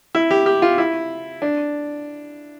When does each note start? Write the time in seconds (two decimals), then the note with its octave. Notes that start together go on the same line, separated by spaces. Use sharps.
0.15 E4
0.31 G4
0.46 G4
0.62 F4
0.78 E4
1.42 D4